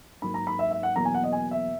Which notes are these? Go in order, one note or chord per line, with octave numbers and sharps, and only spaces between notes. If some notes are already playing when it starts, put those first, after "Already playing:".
G#2 F#3 A#3 B5
A#5
B5
E5
E5
F#5
E2 B2 F#3 A#3 A#5
G#5
F#5
D#5
G#5
E5